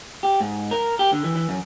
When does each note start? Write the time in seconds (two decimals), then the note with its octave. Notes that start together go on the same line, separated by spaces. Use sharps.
0.23 G4
0.41 G#2
0.71 A#4
0.99 G4
1.13 D3
1.24 E3
1.36 E3
1.49 F#2